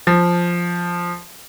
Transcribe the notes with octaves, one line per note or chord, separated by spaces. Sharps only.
F3